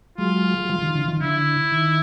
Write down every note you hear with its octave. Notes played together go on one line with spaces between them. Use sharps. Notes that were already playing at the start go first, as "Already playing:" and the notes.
F#3 G#3 F4
F#3
F3 G3
D#3
D3 E3
D#3 F3
D3 E4
D#3